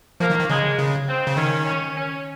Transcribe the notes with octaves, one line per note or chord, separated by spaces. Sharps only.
F3 A#3
D#3
D#3
C#3 G#3
C#3
C4
C#3
D#3 C#4
C#4
C#4